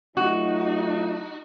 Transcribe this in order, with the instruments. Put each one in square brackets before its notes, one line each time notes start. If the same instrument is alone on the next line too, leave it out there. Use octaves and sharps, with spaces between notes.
[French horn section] F#3 A3 F4 [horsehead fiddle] D#4 [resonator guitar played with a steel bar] F#4